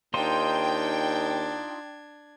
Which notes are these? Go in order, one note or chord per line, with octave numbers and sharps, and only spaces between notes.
D#2 D4 D#4 F4 C5 G5 G#6